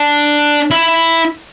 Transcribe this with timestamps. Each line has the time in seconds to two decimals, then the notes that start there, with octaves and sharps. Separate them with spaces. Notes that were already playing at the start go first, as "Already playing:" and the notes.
Already playing: D4
0.71 E4